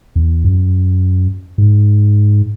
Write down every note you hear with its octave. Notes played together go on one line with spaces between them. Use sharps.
E2
F#2
G#2